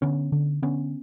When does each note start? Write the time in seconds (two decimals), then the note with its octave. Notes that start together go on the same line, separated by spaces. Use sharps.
0.02 D3 B3 C#4
0.32 D3
0.62 D3 B3 C#4